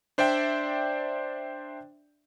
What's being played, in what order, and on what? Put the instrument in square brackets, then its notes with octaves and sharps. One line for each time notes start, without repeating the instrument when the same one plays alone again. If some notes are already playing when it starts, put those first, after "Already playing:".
[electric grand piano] D4 C5 D5 E5 G5